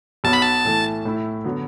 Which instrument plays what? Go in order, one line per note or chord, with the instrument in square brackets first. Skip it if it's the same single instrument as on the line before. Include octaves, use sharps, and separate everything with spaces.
[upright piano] B1 B2 B3 [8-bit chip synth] A5
[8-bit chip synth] B5
A5
[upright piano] A2 E3 A3
A2 A3 E4
D3 F#3 B3